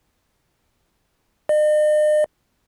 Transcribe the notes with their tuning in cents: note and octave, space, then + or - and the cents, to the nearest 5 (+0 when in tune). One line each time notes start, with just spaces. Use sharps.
D#5 -45